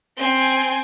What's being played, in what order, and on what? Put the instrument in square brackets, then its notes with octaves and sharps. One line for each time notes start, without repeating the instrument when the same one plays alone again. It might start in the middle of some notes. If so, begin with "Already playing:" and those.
[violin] C4 G#5